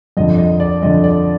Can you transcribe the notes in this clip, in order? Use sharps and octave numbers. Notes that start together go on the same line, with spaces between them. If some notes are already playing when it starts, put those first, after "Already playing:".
F2 D3 D#5
D#5
D5
F2 D3 D#5
D5